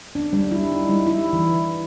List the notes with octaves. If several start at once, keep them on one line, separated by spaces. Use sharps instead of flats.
D4
G3
E4
D#4
G3
E4
E3